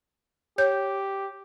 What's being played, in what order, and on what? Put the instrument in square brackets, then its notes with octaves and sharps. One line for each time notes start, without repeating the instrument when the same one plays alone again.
[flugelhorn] G4 [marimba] C#5 G6